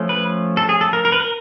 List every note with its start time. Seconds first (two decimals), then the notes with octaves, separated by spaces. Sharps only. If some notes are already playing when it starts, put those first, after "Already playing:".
Already playing: F3 A3 C#4
0.09 B4
0.57 A4
0.69 G#4
0.81 A4
0.93 A#4
1.05 A#4
1.12 B4
1.20 A#4